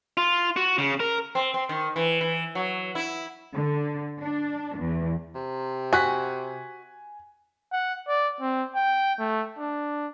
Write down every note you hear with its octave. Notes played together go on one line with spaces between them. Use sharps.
F4
F#4
C#3
A#4
C4
C4
D#3
E3
E3
F#3
E4
D3
D4
E2
C3
F#4 G#5 F#6 B6
F#5
D5
C4
G5
A3
D4